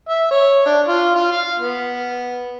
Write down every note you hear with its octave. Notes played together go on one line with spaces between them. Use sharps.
E5
C#5
D4
F4
F4
F5
B3